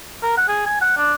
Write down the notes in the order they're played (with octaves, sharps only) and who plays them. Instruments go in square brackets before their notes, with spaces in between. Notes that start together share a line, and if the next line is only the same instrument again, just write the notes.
[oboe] A#4
F#5
G#4
G#5
F#5
D4